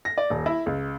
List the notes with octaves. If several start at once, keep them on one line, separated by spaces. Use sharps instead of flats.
A#6
D5
D#1
E4
C#2